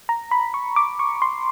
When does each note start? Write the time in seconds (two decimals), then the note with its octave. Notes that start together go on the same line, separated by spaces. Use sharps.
0.09 A#5
0.31 B5
0.54 C#6
0.76 D6
0.99 C#6
1.22 C6